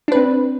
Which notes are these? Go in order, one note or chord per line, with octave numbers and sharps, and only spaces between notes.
C4 D4 B4